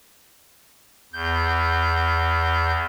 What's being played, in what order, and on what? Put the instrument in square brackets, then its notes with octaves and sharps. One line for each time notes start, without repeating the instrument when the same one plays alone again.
[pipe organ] E2 G6